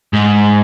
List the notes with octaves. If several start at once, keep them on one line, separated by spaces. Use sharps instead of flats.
G#2